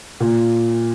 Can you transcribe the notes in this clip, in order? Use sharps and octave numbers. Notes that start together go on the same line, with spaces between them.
A#2